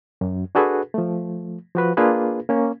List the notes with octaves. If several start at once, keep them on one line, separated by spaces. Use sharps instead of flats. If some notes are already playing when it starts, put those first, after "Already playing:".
F#2
D4 F#4 G#4 A4 B4
F3 A3
F3 F#4 B4
A#3 D4 F4 G#4 B4
A#3 C#4